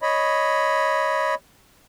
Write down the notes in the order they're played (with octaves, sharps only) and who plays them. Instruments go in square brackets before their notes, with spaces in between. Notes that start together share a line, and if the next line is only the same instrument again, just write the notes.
[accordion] C#5 D#5 B5